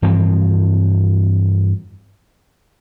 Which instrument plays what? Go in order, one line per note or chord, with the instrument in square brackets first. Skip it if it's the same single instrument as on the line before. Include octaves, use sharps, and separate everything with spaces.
[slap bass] G2 E3 F3 C4